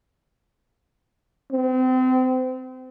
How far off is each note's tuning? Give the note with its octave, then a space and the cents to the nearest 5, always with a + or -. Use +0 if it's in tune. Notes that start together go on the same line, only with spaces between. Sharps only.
C4 -30